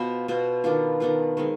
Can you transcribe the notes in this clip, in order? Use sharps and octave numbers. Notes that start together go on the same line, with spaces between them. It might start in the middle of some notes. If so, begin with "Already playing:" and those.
Already playing: B2 B3 F4 C5
B2 B3 F4 C5
D#3 B3 D4 F4
D#3 B3 D4 F4
D#3 G#3 C4